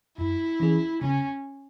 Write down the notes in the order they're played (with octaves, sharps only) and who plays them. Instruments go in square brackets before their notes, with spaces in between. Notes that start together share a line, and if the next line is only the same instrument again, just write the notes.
[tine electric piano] F#2 [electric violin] E4
[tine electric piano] E3 C#4 G#4
[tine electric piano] C#3 [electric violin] C#4